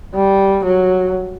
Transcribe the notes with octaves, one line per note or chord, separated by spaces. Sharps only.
G3
F#3